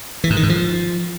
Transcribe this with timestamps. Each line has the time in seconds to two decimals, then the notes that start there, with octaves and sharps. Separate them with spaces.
0.24 E3
0.30 G#2
0.37 D#3
0.43 G#2
0.49 F3